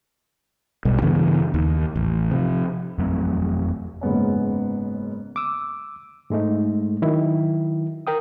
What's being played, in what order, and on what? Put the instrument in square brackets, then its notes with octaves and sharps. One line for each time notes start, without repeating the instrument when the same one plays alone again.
[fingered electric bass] B1 B2 G3
G2 C#3 E3 B3
D#2
A1
C3 F3
[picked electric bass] F2 F#3 A3 C4
[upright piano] F#1 G#2 B3 C#4
[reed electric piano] D6 E6
G#2 G#3 A3 D#4
D#3 F#3 E4
A#4 G5 D#6